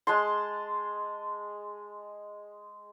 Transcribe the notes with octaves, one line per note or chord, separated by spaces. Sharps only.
G#3 A5 C6